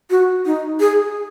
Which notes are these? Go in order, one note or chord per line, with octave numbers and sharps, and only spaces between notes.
F#4
D#4
G#4